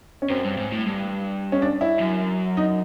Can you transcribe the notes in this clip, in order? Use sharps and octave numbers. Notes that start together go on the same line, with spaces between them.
C#4
F#2 C4
G2
G#2
A2
G2
C#4
D4
E4
F#2
D#4